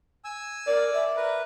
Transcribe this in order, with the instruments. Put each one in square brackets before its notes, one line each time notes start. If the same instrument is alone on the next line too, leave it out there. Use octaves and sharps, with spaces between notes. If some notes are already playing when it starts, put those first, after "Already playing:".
[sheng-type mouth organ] G#5 E6
[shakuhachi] A#4 [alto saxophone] D5
[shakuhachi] E5
[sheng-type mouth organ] A#4 B4